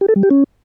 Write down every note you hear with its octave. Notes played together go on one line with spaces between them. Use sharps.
G4
A4
G3
G4
C#4